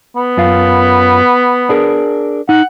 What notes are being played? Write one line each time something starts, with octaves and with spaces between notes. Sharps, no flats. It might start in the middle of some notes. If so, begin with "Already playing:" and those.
B3
F#2 F4 F5
D4 G#4 A#4
D#4 F#5